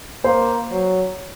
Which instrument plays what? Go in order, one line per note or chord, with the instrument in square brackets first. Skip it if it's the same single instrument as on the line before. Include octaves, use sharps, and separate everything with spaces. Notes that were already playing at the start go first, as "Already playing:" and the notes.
[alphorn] A#3 [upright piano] C5 C6
[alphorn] F#3